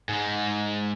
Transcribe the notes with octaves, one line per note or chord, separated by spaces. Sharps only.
G#2 G#3